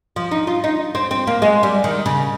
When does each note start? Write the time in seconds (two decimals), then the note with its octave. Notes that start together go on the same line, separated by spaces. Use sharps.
0.16 F3
0.31 D#4
0.47 F4
0.64 D#4
0.95 C4
1.11 C4
1.27 A#3
1.42 G#3
1.63 G3
1.84 D#3
2.06 C#3